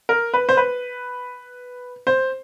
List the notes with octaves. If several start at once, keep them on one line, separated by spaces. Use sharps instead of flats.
A#4
B4
C5
B4
C5